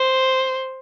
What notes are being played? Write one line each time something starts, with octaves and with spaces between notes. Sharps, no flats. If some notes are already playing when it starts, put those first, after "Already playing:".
Already playing: C5